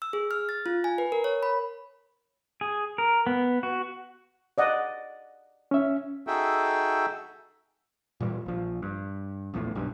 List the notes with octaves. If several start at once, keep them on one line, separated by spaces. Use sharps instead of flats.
E6
G#4
F6
A6
F4
G#5
B4
A#4
C#5
B5
G#4
A#4
B3
F#4
D5 D#5 F#5
C#4 E5
D#4 F#4 G#4 A4 E5 G5
A#2 E3 G3
A#1 F3
G2
A#1 E2 A2
B1 G2